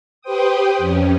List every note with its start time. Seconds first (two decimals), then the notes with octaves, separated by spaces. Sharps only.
0.22 G4 B4 C5 G5 D#6
0.78 F2 C#4